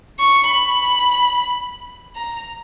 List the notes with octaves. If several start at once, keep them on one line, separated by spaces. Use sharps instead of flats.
C#6
B5
A#5